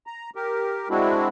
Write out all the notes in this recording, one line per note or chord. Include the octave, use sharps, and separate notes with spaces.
A#5
G4 A#4
G#3 C4 D4 E4 F#4